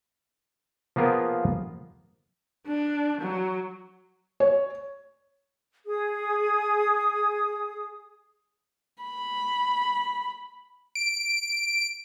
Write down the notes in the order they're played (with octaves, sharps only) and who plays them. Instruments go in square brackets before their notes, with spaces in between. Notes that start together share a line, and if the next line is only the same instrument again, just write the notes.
[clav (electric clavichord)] F3 A#3 B3 F4 G#4 A#4
[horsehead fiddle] D4
F#3
[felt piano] C#5
[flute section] G#4 D#6
[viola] B5
[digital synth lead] D7